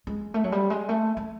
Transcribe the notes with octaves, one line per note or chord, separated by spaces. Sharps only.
G#3
A3
F#3
G3
G#3
A3
A3